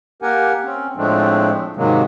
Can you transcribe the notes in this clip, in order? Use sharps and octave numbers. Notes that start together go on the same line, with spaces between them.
A#3 G4 A#4 F#5 G#5
C4 C#4
A2 F3 G#3 A3 C4 D4
G#2 C3 D#3 F#3 G#3 A#3